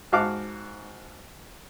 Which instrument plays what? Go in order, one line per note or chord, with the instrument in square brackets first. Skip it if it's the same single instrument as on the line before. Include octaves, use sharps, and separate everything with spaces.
[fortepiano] G#2 F#4 F5 A5 D6 F#6